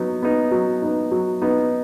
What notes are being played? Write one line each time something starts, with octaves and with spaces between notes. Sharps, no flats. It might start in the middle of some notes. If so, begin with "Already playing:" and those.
Already playing: F#3 B3 D#4
B3 D#4
F#3
B3 D#4
F#3
B3 D#4